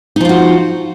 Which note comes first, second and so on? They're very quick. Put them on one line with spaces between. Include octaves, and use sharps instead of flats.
D#4 F3 F4 F#4